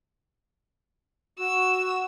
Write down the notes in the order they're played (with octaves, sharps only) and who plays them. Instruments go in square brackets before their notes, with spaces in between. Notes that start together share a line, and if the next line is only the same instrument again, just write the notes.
[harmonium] F#4 [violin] E6